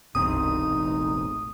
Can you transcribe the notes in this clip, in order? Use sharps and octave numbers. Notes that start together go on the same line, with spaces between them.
E1 C2 G2 C4 D#4 D#6
A1